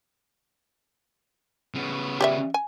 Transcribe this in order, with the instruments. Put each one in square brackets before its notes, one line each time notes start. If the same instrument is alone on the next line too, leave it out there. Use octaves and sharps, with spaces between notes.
[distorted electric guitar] C#3 B3
[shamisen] G4 D5 E5
G#5